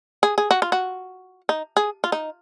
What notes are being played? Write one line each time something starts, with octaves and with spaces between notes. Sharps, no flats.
G#4
G#4
F#4
F4
F#4
D#4
G#4
F4
D#4